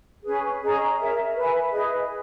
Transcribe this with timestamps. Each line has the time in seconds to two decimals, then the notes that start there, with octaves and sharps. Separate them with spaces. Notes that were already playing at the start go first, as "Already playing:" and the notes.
0.25 C#4 G#4 B4
0.62 C#4 G#4 D#5 A#5
0.98 A#4 C#5 E5
1.35 B4 E5 G#5
1.71 E4 G#4 B4 D#5